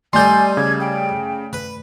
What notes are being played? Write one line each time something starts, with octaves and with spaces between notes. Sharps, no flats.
G3 A3 D#4 A4 D5 G#5 C6 G6
C#3 D6 G#6
G5
B4